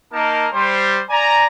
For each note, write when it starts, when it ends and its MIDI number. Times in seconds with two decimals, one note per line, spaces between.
0.13 0.46 58
0.13 0.46 63
0.13 0.46 70
0.13 0.46 75
0.13 0.46 81
0.53 1.01 55
0.53 1.01 72
1.09 1.45 74
1.09 1.45 80
1.09 1.45 82